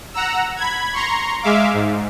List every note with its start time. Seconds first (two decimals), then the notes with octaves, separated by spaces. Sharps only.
0.14 F#5 A#5 E6
0.56 B5 G#6
0.93 A#5 C6 C#6
1.42 G#3 E5 F5 D6
1.74 G#2